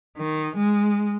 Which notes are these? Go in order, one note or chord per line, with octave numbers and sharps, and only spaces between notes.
D#3
G#3